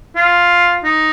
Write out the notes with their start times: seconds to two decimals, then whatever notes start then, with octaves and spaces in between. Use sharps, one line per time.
0.15 F4
0.84 D#4